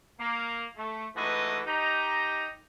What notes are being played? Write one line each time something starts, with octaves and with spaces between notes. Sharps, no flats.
A#3
A3
G#2 E3 A3 F#4 B4 D#5
D#4 G4 A#5